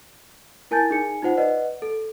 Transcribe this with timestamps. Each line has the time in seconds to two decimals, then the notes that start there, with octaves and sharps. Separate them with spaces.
0.71 E4 A#4 G#5 A5 G6 A6
0.90 D#4 G#4 G#5 C#7
1.22 D#4 F4 C5 F#5
1.37 B4 D5 D#5 F#5
1.82 A4